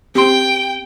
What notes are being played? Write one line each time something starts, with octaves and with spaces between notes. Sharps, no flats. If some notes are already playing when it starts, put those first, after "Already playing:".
C4 G4 G5 C6